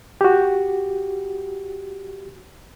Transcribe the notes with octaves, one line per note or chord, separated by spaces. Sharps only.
F#4 G4